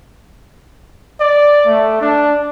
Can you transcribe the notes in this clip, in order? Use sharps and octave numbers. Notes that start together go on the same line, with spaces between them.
D5
A3
D4